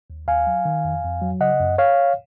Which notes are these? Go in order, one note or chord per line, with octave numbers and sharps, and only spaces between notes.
D#2
D#2 F5 G#5
F#3
D#3
F2
F2
F#3
C#3 D#5 F#5
F#2
C#5 F5